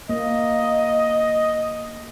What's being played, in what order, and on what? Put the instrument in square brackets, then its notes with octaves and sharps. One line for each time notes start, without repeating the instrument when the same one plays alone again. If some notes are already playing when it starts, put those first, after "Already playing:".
[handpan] A#3 [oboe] D#5